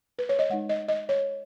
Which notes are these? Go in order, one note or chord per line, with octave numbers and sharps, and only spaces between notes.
B4
C#5
D#5
G#3 D#4 F#5
D#5
D#5
C#5